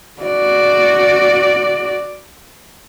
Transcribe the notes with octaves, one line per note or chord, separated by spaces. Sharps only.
F#4 D5